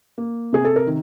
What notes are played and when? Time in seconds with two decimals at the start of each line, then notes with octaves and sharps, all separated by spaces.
0.18 A#3
0.52 C3 G#4
0.65 A4
0.76 A#4
0.87 D#3